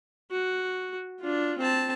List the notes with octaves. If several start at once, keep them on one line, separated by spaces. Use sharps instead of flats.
F#4
D4 F4
C4 A5